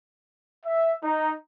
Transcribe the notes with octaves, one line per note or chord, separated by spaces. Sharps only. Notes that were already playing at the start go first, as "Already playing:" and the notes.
E5
D#4